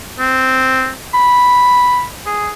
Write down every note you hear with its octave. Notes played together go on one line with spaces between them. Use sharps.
C4
B5
G#4